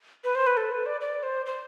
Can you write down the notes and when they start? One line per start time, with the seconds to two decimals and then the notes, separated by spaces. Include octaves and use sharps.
0.24 B4
0.35 C5
0.47 B4
0.57 A4
0.71 B4
0.86 D5
1.01 D5
1.23 C5
1.46 C5